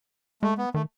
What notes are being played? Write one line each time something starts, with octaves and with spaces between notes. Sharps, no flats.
G#3 A3
B3
D#3 A3